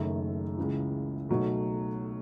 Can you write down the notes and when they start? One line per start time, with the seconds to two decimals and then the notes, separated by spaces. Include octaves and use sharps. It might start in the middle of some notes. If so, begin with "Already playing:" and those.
Already playing: F#1 F#2 D#3 A3 E5
0.57 C#2 C#3 E3
1.29 B1 B2 F#3 A3